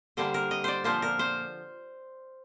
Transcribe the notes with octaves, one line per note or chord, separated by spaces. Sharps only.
D3 G3 A#3 C5
A#4
D#5
C5 D5
A#2 F3 A#3 C5
A#4
C5